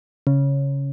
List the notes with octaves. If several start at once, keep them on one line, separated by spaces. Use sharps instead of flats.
C#3